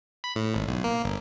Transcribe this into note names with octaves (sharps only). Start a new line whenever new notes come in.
B5
A2
G#1
B1
A#3
G1